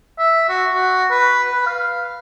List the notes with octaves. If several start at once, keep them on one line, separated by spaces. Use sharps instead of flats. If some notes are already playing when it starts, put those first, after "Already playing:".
E5
F#4
F#4
B4
B4
F5